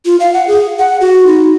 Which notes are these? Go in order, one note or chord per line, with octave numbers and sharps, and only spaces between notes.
F4
F5
F#5
G#4
F#5
F#4
D#4